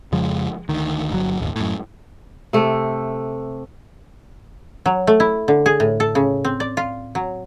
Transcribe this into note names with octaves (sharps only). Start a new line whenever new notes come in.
F2 C#3 F3 G#3
D2 D#3
G1 F#3
D#1 G#1 D#2
F#2 A2
C3 A3
F#3
A3
E4
D3
G#4
A2
A4
C#3
C4
D5
F4
F#3